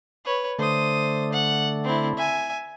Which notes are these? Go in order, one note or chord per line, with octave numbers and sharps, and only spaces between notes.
B4 C#5
D3 A3 C5 D#6
F#5
C4 E4
E5 G#5